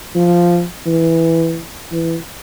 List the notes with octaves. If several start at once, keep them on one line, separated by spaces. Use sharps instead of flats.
F3
E3
E3